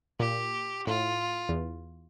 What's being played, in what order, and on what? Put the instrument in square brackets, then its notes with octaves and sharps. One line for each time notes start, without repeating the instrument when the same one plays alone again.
[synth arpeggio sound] A#2 [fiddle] G4
[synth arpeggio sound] A2 [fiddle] F4
[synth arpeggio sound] E2